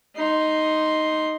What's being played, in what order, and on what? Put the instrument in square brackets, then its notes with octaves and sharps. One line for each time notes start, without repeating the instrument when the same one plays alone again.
[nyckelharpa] D#4 C6